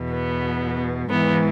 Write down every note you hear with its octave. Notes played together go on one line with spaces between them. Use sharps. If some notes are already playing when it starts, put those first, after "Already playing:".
Already playing: E2 B2
B3
G#2 E3 B3